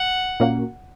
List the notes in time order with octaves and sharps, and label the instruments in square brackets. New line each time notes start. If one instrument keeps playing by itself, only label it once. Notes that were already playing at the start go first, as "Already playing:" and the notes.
Already playing: [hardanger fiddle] F#5
[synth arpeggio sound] A#2 A#3 C#4 F#4